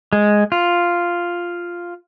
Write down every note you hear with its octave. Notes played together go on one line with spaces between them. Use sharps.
G#3
F4